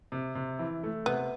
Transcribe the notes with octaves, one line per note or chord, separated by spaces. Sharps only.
C3
C3
E3
A3
C3 B3